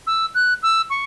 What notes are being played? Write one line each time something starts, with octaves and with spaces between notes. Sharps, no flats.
E6
F#6
E6
C#6